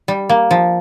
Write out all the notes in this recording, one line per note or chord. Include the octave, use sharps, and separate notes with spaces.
G3
A#3
F3